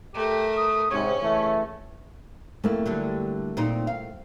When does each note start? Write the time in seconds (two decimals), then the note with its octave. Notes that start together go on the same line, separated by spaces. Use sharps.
0.14 A3 G4 A#4
0.57 D#6
0.91 G#2 C3 C#4 C#5
1.21 C#3 E3 A3
2.64 F2 A3 A#3 E4
2.86 D3 F#3 G3
3.57 A#2 C4 D#4
3.87 F5